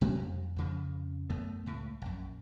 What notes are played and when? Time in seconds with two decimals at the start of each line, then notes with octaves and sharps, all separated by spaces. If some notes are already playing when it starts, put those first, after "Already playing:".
0.01 B2 F#3 G3 A#3
0.15 F2
0.56 F2 C#3 F3
1.30 F#2 A3 B3
1.66 C#2 A2
2.02 A#1 F#2